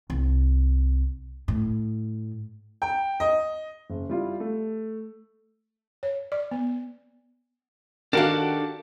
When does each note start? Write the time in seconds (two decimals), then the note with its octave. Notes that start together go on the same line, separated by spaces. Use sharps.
0.10 C2
1.48 A2
2.82 G5
3.20 D#5
3.90 F#1
4.09 G3 E4 F4
4.40 A3
6.03 C#5
6.32 D5
6.51 B3
8.13 D#3 D4 F#4 G4 A4 A#4 F5